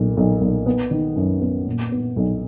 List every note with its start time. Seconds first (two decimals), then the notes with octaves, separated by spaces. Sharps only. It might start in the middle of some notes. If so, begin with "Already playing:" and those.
Already playing: B1 A#2
0.17 B1
0.41 B1
0.66 B3
0.91 D#3
1.16 F#2
1.41 B3
1.67 A#2
1.92 B3
2.16 B1